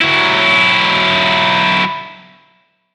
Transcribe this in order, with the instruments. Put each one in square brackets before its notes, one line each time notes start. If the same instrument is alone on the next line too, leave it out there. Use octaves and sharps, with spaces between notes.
[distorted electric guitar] F#3 E4